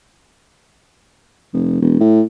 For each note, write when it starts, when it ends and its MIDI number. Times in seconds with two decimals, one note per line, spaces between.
1.54 1.81 29
1.82 1.96 28
2.00 2.22 45